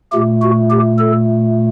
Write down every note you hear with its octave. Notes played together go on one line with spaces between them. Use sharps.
A#2 A3 G4
F#4
G4
A4